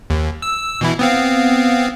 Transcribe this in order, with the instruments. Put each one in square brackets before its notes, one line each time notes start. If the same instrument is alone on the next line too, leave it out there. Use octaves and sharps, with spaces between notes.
[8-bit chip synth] D#2
E6
B2 E3 E4
B3 C4 F5